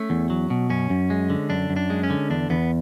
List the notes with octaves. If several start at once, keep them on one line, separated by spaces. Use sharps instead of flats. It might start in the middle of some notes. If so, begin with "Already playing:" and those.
Already playing: A3 C#4
E2
F#3
B2
F#2 C#4
F#2
G#3
D3
F#2 D4
F#2
D4
G#3
C#4
D3
E2 D4
E2 B3